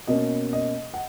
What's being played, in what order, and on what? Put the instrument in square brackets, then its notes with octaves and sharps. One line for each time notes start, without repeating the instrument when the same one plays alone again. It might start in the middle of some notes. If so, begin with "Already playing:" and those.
[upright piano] B2 A#3 C#4 D#5
D#5
F#5